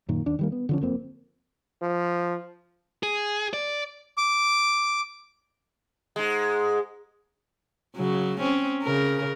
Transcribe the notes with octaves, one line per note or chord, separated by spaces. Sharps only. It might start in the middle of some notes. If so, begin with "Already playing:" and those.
F#2 A#2 D#3
D#2 D4
D#3 G3 A#3
B3
D3 F3 C#4
F#1 F2 A#3 C4
F3
G#4
D5
D6
G#2 G#3
C#3 F#3
C4 C#4
C#3 A#4